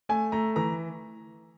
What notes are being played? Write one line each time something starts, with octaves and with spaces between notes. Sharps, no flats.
A3 G#5
A3 A#5
E3 A#5